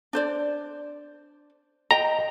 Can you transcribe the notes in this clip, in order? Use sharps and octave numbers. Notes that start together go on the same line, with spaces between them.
D4 C5 D5
D#5 G5 A#5